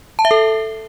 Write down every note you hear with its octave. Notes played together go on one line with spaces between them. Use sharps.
A5
E5
A4